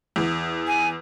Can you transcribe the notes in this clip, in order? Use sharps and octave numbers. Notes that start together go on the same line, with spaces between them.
E2
G#5